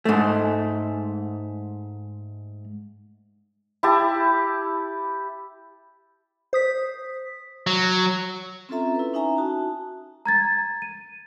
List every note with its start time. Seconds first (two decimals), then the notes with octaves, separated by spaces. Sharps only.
0.05 G#2 A3
3.83 E4 G4 A5
6.53 C5 D#6 B6
7.67 F#3
8.69 C4 C#4 F4 A4 E5 A#5
8.95 E4 B4
9.13 C#4 D#4 E5 G#5 A#5 C#6
9.38 D#4 F#4 A5
10.26 A#5 G#6 A6
10.82 D#7